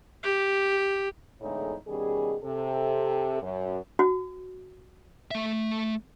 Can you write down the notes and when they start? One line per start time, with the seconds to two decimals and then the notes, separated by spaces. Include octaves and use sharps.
0.23 G4
1.40 E2 A2 D3 G#3 D#4 C#5
1.87 B2 D#3 G3 C#4 G#4
2.43 C3 A4
3.41 F#2
3.99 F#4
5.31 A3 E5